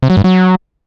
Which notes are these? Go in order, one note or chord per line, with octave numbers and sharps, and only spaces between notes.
C3
F#3
G2
F#3